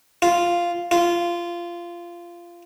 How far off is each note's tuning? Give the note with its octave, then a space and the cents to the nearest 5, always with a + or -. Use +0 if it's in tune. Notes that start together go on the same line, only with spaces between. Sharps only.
F4 -5
F4 -15